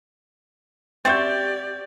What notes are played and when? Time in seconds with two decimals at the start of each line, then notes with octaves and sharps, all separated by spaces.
1.05 C4 F#4 G4 D5 E5 G6 A6